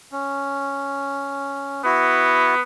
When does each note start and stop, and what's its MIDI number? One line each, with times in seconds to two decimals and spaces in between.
0.12 1.82 61
1.85 2.62 59
1.85 2.55 64
1.85 2.55 66